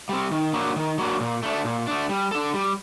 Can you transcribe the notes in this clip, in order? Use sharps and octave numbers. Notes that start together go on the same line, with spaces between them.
G3 C4
D#3
F#3 A#3 D4
D#3
F#3 A#3 D4
A#2
A3 D4
A#2
A3 D4
G3
D4 A4
G3